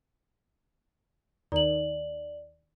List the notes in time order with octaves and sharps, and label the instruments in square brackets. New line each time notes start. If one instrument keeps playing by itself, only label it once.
[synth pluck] D#2 [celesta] D5 F#7